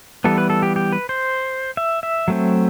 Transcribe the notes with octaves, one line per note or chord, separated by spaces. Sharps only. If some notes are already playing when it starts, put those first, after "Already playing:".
E3 G3 B3 A4
B4
A4
G4
G4
B4
C5
E5
E5
F#3 A3 C4